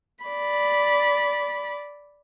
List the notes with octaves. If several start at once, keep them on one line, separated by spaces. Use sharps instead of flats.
D5 B5